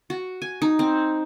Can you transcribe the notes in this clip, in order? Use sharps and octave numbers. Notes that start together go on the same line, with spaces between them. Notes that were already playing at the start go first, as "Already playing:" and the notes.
F#4
G#5
D#4
C4